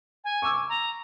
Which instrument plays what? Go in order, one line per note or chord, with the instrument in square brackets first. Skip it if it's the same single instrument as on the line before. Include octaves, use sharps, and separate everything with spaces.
[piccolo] G#5
[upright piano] C#6 D6 E6
[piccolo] A#5